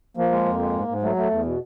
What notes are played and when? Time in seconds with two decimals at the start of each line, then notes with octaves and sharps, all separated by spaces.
0.17 F3 A#3
0.31 G#3
0.45 F2
0.60 G#3
0.73 G#2
0.88 G#2
1.02 F#3 A3
1.16 A3
1.31 E2
1.45 B2